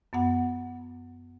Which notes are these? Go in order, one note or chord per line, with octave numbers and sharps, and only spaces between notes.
F#2 B3 F#5